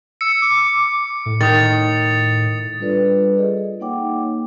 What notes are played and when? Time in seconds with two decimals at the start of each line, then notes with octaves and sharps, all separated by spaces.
0.21 E6 C#7
0.42 D6
1.26 A2
1.41 D#3 D#6 A6
2.79 G3 D4 F4 A4 B4 D5
3.38 G#4 D#5
3.80 A#3 D#4 C#5 F#5 G5 D6